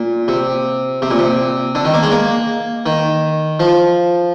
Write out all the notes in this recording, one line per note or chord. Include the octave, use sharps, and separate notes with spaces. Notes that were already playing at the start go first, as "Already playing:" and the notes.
Already playing: A#2
C3
C3
A#2
C3
D3
D#3
A#3
G#3
A#3
D#3
F3